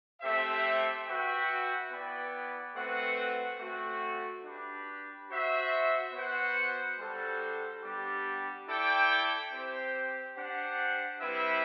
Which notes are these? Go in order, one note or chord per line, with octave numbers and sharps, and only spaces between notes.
A3 C4 G4 C5 E5
F#4 B4 E5 G5
B3 E4 B4 D5 G5
A3 C4 F#4 B4 F#5
A3 C4 F#4
D4 G4 B4
F#4 C5 E5
B3 F#4 C5 F#5
G3 D4 F#4 A4 C5
G3 B3 D4 G4
E4 A4 D5 G5
C4 G4 C5
D4 G4 C5 F#5
G3 C4 E4 B4 E5